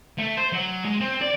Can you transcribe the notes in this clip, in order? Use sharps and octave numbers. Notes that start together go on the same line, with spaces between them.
A3
C5
F#3
G#3
C4
D5